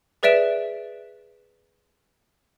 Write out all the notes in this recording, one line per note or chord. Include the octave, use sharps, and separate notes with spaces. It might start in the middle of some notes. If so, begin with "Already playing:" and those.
G#4 B4 D5 E5 D7 E7